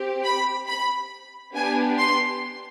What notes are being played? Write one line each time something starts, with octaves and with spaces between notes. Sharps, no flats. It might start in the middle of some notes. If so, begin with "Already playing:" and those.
Already playing: C4 G4
B5
B5
B3 D4 G4 G#5
C6